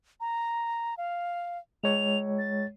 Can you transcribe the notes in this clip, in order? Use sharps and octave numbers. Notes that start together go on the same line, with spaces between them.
A#5
F5
G#3 C#5 F7
A6